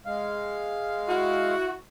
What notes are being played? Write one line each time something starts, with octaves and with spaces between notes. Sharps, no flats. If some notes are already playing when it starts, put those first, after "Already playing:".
G#3 F5
E4 F#4